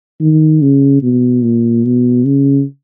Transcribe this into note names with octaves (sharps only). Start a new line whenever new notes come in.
D#3
C#3
B2
A#2
B2
C#3